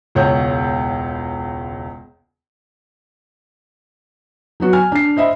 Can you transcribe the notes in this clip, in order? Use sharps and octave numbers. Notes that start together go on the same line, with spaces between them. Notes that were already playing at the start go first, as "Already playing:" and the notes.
E1 C#2 C#5 F#5 G6
F#3 B3 F#4
G#5 F6
D4 C7
C5 D#5 E5 B5